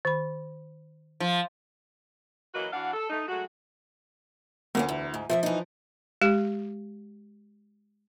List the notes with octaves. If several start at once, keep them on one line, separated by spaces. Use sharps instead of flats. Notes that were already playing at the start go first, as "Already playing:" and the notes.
D#3 B5
F3
E3 F#3 A#3 F#4 B4 D#5
E3 D4 F#4 F5 F#5
A4
A3 D#4
F#3 G#3 A3 F#4
D2 A#3 B3 C#4
E2
G#2
F2 D#3 F3 E5
E3 D#4
G#3 G4